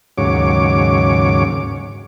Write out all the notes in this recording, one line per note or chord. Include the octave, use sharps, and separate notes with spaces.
D#2 G#2 C#3 F#3 C#5 D6